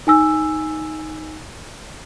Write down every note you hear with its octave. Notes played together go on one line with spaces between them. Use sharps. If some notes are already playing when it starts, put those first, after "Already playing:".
D#4 G#5 E6